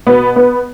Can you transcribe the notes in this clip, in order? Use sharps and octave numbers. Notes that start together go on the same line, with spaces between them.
B2 B3
B3